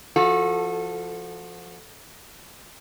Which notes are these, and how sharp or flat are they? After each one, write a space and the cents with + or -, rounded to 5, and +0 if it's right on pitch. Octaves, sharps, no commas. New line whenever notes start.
F3 -20 F#4 -35 A4 +0